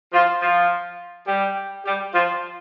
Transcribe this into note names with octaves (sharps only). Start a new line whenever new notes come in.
F3 F4
F3 F4
G3 G4
G3 G4
F3 F4